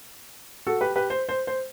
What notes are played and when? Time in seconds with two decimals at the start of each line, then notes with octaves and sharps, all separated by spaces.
0.67 F#4 A4
0.81 G4 B4
0.96 G4 B4
1.10 C5
1.29 C5
1.47 C5